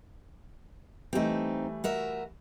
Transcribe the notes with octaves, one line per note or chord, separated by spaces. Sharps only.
E3 G3 A3 C4 D#4
F#4 A#4 E5